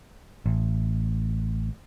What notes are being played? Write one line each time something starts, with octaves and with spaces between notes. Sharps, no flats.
A1